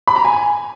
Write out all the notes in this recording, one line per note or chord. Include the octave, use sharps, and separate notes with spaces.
B5
A#5
G#5